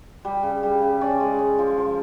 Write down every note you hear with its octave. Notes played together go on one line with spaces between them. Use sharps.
G3
C#3
G3
C#3
C#4 D5
G#3
C#4
F3
F3